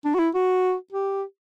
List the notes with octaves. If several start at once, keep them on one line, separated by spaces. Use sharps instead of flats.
D4
F#4
E4
F#4
G4